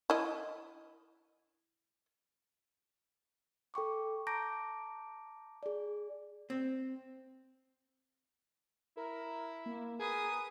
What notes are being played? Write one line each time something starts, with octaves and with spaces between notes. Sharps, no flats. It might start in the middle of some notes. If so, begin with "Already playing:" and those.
E4 D#5
A4 G5 C#6 D6
A5 A#5 D6 G6 A#6 D7
G#4 D5
C4
E4 A#4
A#3
G#4 A#4 B4 D#6